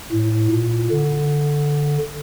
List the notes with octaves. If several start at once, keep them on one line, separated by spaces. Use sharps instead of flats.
A2
A#2
D3